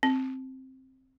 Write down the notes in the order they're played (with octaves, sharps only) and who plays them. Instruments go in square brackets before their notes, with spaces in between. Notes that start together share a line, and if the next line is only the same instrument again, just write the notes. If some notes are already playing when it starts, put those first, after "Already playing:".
[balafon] C4